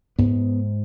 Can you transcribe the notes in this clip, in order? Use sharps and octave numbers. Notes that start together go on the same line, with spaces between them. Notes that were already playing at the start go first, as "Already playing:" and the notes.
G#2 B3